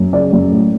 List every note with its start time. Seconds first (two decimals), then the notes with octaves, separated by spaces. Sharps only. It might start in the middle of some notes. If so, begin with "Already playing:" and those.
Already playing: F#2
0.12 C#3 D5
0.33 F#2
0.52 A2